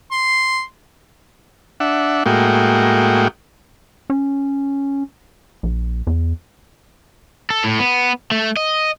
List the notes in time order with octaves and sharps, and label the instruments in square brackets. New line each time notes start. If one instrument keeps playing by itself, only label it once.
[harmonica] C6
[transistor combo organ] D4 E5 F#5
A2 G#3 A#3 F#4 G5
[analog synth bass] C#4
A#1
E2
[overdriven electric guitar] A4
A2
B3
A3
D#5